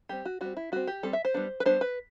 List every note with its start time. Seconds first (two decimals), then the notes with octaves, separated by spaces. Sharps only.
0.09 G3 C4 G4
0.25 F#4
0.41 G3 C4 F#4
0.57 E4
0.72 G3 C4 F#4
0.87 G4
1.03 G3 C4 A4
1.13 E5
1.25 C5
1.34 G3 B3 D4
1.60 B4
1.66 G3 B3 D4 C5
1.81 B4